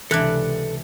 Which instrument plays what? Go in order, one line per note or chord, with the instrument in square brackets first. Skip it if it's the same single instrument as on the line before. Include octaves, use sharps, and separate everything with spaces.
[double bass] C#2 C3 [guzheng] E3 D4 [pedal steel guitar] A4 F#6